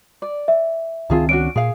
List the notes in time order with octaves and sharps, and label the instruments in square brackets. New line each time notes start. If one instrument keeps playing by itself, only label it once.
[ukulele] D5
[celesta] E5
[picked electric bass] C#2 D#3 C4 [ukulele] F4 G#4 A5
[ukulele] C#4 D4 F#4 [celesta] D7
[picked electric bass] A#2 [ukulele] G#4 F5